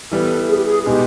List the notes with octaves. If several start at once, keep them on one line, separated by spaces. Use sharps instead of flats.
E3 G3 B3 A4
G#4
G4
G#4
B2 G#3 B3 D#4 G4